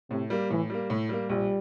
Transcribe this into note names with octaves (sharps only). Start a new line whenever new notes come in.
A2 C3
G3 A#3
A2 E3
G3 A#3
A2
G3 A#3
A#1 G3